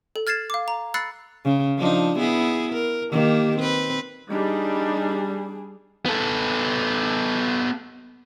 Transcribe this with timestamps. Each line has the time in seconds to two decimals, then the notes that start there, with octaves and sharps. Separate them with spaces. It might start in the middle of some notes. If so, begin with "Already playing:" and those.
0.16 A4
0.27 F6 G#6 A6 C7 E7
0.50 F5 D6
0.68 A#5
0.94 B5 E6 F#6 A6 C7 C#7
1.45 C#3
1.77 F3 D4 D#4
2.19 B3 E4 G#4
2.73 A#4
3.12 D#3 A#3 G4
3.58 C4 B4
4.30 G3 D4 D#4 G#4
6.06 B3 A4